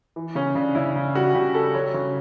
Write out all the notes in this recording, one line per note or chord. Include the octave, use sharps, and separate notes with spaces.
E3
C#3 C#4
C#3 D4
C#3 E4
C#3
G3 F#4
C#3 G4
G3 A4
F#3 C#5
C#3 C#5